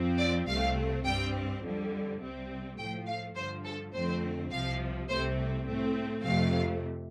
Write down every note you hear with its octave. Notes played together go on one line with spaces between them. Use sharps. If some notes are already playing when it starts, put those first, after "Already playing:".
Already playing: F2 F3 C4
D5
C2 C3 A3 C4 F5
G2 G3 C4 G5
F2 D3 G3
C2 C3 G3 C4
A2 F3 A3 G5
F5
G2 D3 F3 C5
A4
F2 D3 A3 C4 C5
C2 C3 F3 F5
C2 C3 A3 C4 C5
A2 A3 C4
F2 C3 A3 F5